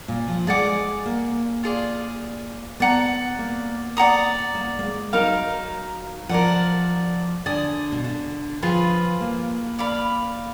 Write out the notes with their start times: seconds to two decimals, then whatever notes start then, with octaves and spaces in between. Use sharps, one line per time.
0.08 A#2
0.28 F3
0.47 G#3 G#4 D5 F#5 D6
1.06 A#3
1.63 F4 G#4 D5
2.80 B3 D5 F#5 A#5
3.39 A#3
3.97 D5 F#5 A#5 D#6
4.55 A#3
4.79 A#3
4.84 G#3
5.13 F#3 D#4 A#4 F5
6.29 F3 A#4 D5 F#5
7.46 D3 D5 G#5 D#6
7.92 B2
8.04 D3
8.62 F3 F4 G#4 B4
9.21 A#3
9.79 D5 F5 B5